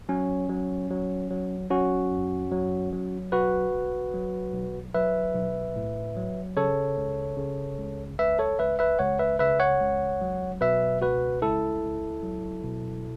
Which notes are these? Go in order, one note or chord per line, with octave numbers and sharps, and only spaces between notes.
F#3 C#4
F#3
F#3
F#3
F#3 C#4 F#4
F#2
F#3
F#3
B1 F#4 B4
B1
F#3
B1
F#3 B4 E5
B1
A2
F#3
C#3 A4 C#5
C#2
C#3
C#2
C#2 B4 E5
A4 C#5
C#2 B4 E5
B4 E5
C#2 C#5 F#5
B4 E5
C#3 B4 E5
C#5 F#5
C#2
F#3
B2 B4 E5
C#2 F#4 B4
C#2 E4 A4
C#2
F#3
B2